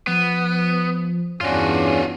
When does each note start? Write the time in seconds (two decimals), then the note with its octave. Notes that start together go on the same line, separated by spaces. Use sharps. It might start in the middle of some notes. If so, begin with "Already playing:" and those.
0.07 F3 B3
1.41 E2 G2 C#4 D4 F4 F#4